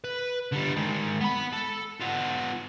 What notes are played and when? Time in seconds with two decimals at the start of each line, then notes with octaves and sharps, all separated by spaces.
0.04 B4
0.53 D3 G3
0.77 D#3 G#3
1.21 B3 B5
1.53 A4
2.01 B3 F4